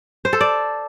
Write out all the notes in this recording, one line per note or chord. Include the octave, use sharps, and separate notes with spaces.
C5
A4
D5